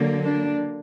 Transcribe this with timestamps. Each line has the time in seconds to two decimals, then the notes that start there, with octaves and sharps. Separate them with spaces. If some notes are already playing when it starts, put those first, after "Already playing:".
Already playing: D3 F#3 A#3
0.22 D4